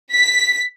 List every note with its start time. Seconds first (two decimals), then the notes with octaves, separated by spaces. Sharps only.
0.14 B6